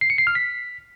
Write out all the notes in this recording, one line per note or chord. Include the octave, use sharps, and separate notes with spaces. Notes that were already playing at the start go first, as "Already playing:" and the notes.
C7
C#7
C7
F6
B6